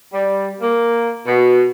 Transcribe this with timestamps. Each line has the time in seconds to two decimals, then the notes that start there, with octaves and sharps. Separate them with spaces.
0.13 G3
0.60 A#3
1.26 B2